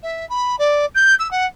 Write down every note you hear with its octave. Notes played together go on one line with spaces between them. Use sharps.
E5
B5
D5
G6
E6
F#5